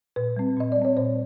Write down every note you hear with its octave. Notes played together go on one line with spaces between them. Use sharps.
A#2 B4
G3 C4
A#2 D#5
G3 D5
C4 C#5
A#2 C5